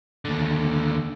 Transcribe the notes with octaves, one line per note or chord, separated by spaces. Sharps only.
D#2 D3